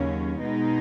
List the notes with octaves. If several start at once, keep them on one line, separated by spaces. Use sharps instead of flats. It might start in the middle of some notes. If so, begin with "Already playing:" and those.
Already playing: D#2 C#3 F#3 C#4
B2 G#3 B3 D#4